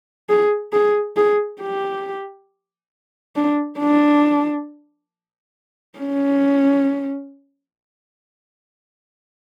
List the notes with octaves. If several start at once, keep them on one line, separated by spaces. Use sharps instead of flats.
G#4
G#4
G#4
G4
D4
D4
C#4